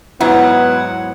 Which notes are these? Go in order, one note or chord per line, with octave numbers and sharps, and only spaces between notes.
G#2 F#3 B3 E4 F#5